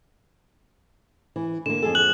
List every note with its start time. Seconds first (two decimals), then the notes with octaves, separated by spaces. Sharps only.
1.36 E3
1.66 D3 A#3 E7
1.82 F2 G#4 A4
1.95 F#6 F#7